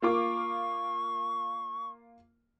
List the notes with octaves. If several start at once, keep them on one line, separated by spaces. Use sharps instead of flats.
A#3 F4 C#6 D6